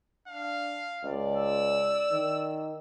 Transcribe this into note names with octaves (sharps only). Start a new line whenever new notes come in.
D4 F5
C#2 D5
E6
D#3